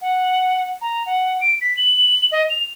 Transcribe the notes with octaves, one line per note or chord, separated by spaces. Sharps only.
F#5
A#5
F#5
D7
B6
F#7
D#5
F7